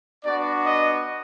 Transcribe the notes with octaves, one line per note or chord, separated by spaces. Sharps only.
B3 D4 F#4 D5
D#5